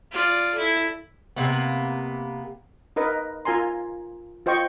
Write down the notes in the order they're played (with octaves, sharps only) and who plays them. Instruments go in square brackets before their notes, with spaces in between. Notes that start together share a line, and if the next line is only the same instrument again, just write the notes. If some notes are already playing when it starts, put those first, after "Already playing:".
[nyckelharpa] F4 D5
E4 A4
[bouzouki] C3 A#3 B3
[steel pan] D#4 A#4 B4 D#5
F4 A#4 G#5 A#5 C6
F4 C5 D#5 G5 C#6